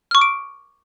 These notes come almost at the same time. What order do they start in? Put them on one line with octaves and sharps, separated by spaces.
F6 C#6 D6 D7